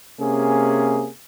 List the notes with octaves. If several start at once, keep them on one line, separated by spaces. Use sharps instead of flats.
C3 A#3 C#4 G#4